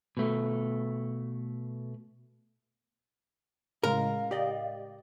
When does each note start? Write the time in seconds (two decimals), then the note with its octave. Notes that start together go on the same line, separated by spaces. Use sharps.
0.17 B2 A3
3.84 A2 C#3 G#3 A#4 F5
4.31 G4 D5 D#5